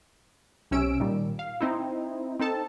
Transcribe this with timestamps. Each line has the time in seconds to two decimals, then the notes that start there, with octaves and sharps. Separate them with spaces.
0.71 B1 C3 C#4 E6 D7
1.00 A#2 D#3 G3
1.39 F5
1.61 C4 D#4 E4
2.40 C4 D#4 A4 A5